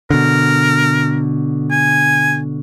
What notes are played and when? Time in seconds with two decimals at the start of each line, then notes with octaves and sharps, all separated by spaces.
0.10 B2 D3 A#4
1.71 G#5